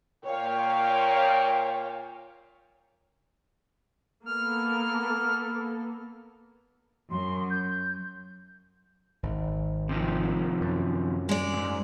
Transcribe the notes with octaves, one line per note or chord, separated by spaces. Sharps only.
A#2 C#5 F5 G5
A#3 B3 A4 F6
F#2 C6
G6
G#1
C3 D#3 F3
F#2
G#3 D5
E2 G#2